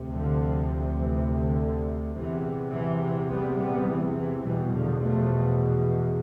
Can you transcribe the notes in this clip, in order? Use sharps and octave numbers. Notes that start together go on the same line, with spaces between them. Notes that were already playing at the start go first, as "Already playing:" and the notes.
Already playing: D2 C3
D3 F3
E3
D3
E2 C3 E3
E3
G3 B3
G3 B3
E3
E3
E2 B2 E3 G3
D3 F3
F3 A3